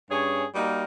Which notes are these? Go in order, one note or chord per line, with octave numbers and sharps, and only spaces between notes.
G2 C#4 G#4 C#5
G3 A#3 D#4 F#4 A#4